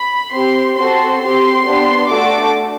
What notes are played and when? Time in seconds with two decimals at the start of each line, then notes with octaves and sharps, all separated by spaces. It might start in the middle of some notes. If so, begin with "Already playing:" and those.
Already playing: B5
0.33 C4 G4 C6
0.77 C4 F#4 A4 C6
1.22 C4 G4 C6
1.66 B3 D4 G4
2.10 A3 D4 F#4 A4 D6